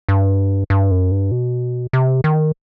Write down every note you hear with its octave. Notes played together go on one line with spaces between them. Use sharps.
G2
G2
F#2
G2
B2
C3
D#3